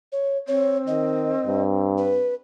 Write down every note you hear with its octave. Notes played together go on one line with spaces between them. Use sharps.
C#5
C4 C#5
D#3 D#5
G2
B4